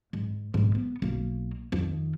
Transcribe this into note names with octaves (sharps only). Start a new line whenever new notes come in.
G#2
G#2 B2
B3
B1 A#3
F2 D#3